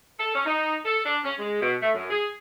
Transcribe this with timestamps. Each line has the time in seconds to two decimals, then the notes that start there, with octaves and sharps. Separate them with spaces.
0.19 A4
0.34 C#4
0.46 D#4
0.85 A4
1.05 D4
1.24 C#4
1.39 G#3
1.61 B2
1.81 A3
1.95 F#2
2.10 G#4